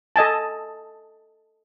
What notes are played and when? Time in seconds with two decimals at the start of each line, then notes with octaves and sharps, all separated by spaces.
0.16 A4 D#5 G#5 A5